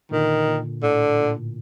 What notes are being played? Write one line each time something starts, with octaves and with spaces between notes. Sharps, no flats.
A#2 D3 D#3
A#2
A2 D3
A#2